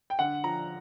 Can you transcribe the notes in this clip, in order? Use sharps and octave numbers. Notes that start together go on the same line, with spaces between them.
G5
D3 F#5
F3 A#5